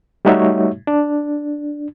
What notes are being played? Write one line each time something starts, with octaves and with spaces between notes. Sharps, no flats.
G3 A3 D#4 F#4 C#5 E5
D4